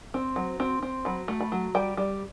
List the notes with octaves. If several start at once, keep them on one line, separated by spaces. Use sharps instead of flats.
C4
F#3
C4
C4
F#3 B5
A3
B5
F#3
G3 G5
G3